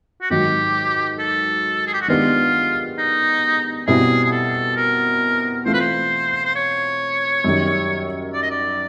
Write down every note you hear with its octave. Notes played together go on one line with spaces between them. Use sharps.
F#4
G#2 D#3 F#3 G4
A4
G#4
G4
F#4
D#3 G#3 B3 D4 F4 G4
D#4
B2 G3 C4 E4 G#4
G#4
A4
A#4
E3 A3 C4 F4 C5
B4
C5
C5
C#5
F#2 D#3 G3
D5
D#5
D5